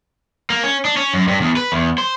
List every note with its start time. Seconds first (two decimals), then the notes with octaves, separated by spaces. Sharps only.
0.50 A#3
0.63 C#4
0.85 D4
0.97 C#4
1.14 F#2
1.28 G2
1.41 E2
1.57 B4
1.72 E2
1.98 C5